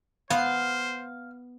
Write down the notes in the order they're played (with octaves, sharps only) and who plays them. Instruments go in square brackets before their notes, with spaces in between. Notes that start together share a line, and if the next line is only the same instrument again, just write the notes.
[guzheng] B3 [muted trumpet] C5 [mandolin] F5